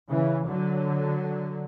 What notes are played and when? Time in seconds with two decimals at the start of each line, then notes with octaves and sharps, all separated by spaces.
0.10 C#3 E3
0.47 D3 F#3